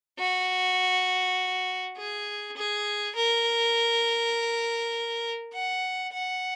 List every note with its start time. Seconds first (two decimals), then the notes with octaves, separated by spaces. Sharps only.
0.19 F#4
1.97 G#4
2.57 G#4
3.16 A#4
5.53 F#5
6.13 F#5